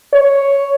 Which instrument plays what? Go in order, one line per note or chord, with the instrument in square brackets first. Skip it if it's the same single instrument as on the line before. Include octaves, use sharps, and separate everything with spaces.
[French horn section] C#5